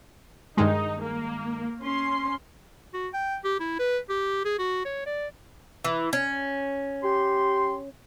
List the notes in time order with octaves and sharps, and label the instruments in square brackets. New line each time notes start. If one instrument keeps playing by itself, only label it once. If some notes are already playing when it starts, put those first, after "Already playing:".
[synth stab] G2 D#3 G#3 [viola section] D#4
[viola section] A#3
C#4 C6
[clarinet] F#4
G5
G4
E4
B4
G4
G#4
F#4
C#5
D5
[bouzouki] E3
C#4
[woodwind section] G4 C6